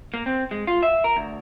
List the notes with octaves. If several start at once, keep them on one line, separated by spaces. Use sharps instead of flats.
A#3
C4
G#3
F4
E5
A#4
D2